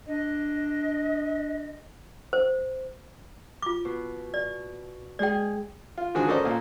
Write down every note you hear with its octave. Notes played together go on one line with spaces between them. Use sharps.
D4 D#5
C5
F4 D6
B2
D5
G#3 G#4 D5 G5
F4
D3 D#3 F3 G#3 F#4 G#4
C#4 A4 A#4 C5 D5 D#5
A#2 A#3